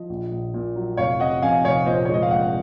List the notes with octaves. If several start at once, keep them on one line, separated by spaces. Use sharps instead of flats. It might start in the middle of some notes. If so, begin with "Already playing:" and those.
Already playing: F3 D#5
A#1
A#1
A#2
F#3
F1 C#5 F5
C3 D#5 F#5
F2 F5 G#5
F1 C#5 F5
A#2 C5 D#5
C#5
G#3 D#5
F5
A#1 D#5 F#5